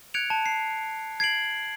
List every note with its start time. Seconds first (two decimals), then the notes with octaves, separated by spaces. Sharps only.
0.14 F#6 G#6 C#7 D7 F7
0.30 A5
0.46 C7
1.20 G#6 C7 D7 F#7